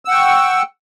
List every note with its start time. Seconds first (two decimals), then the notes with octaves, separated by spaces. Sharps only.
0.05 E6
0.08 F#5
0.11 G5
0.14 C#6